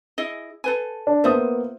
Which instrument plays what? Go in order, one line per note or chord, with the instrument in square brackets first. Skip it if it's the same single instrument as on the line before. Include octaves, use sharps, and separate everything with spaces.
[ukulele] E4 G#4 D#5
A4 B4 G#5
[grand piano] D4
[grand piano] A#3 B3 D#6 [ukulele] F4 C5 E5